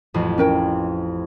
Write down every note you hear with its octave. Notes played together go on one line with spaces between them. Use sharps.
A1 F2
C#4 A#4 G5